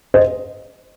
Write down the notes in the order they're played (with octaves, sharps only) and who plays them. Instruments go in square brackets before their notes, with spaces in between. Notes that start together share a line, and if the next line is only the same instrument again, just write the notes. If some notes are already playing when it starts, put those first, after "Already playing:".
[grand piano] C5 D#5